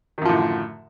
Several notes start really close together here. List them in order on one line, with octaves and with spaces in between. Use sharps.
D#3 F#2 F3 A2 D3